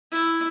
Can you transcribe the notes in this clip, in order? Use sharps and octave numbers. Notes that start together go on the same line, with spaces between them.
E4